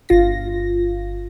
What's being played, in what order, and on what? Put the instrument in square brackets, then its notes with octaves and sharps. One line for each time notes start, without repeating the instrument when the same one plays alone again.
[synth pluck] G1 F4 A#6